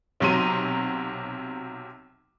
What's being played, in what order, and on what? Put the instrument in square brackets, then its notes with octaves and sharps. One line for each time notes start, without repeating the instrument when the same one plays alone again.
[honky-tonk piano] B1 C3 F#3 A#5 C6 D#7